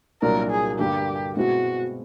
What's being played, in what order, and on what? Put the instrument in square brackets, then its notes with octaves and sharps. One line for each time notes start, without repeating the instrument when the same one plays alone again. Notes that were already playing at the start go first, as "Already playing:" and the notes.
[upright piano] C2 A#2 F#3 A#3 D4 [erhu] A#4
[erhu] G#4
[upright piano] G2 D3 G3 A#3 [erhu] G4
[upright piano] B2 G#3 C4 E4 [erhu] F#4